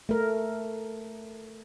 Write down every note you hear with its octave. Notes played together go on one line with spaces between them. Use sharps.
A3 A#4